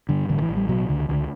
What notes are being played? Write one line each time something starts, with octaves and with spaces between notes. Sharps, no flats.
G2 D3
A1 D3
E3
A1
G3
B2 F#3
C#2 D3
C#2 D3